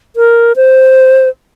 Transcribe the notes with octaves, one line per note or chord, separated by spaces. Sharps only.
A#4
C5